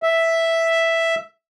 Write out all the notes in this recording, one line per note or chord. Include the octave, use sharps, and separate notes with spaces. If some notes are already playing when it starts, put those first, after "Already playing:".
E5